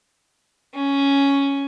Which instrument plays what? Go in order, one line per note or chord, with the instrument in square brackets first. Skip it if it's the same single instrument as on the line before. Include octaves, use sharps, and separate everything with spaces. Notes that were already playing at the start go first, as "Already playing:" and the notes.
[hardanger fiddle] C#4